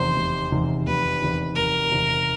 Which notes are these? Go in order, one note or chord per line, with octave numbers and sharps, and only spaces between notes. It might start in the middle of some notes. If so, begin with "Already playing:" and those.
Already playing: F1 E2 C3 D#3 C5
F1
E2 C3 D#3
F1 B4
E2 C3 D#3
F1 A#4
E2 C3 D#3